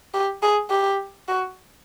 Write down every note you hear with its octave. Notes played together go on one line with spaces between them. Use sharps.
G4
G#4
G4
F#4